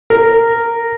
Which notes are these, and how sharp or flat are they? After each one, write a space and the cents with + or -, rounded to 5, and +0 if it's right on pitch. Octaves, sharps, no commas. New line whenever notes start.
A#4 -10